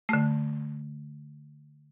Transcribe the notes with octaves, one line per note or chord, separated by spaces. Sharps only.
D3 A3